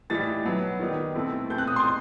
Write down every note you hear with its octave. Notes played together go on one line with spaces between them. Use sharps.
A2 E3 G3 D#4 A6
B2 F#3 B3
D#3 G3 B3 D#4
B2 A3 C4 E4
B2 A3 C4 G6
F#6
D#6
C6
D#4